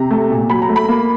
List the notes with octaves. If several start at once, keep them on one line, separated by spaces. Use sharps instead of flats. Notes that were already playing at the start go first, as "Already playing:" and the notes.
Already playing: C3 A#5
A3
A#2
F#3 B5
A#5
A3
B5
A#3